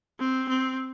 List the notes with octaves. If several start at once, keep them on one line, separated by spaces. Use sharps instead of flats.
C4
C4